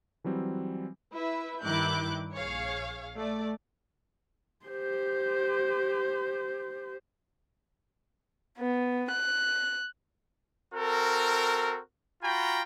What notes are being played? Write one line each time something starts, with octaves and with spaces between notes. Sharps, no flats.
E3 F#3 G3 C4
E4 B4 E5
G2 D#3 E4 D6 F#6 G6
A#1 G#4 C#5 F5
A3 D5
G4 C5
B3
F#6
C4 F#4 A4 A#4
F4 F#4 G5 A#5 B5